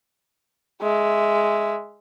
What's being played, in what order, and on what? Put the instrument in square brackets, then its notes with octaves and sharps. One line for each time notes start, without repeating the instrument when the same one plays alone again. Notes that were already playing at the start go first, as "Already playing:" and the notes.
[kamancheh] G#3 E5